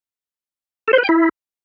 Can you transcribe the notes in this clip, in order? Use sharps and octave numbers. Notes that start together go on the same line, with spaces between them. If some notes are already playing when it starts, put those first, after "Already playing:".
A4
C5
B4
G5
E4